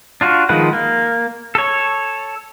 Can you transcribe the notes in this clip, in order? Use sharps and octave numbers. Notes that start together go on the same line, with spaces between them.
D4 F4 F#4
D#3 F3 G#3 B4 F#5
A#3
A4 C#5